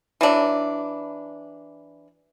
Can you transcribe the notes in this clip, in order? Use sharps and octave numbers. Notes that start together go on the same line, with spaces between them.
E3 F#3 D4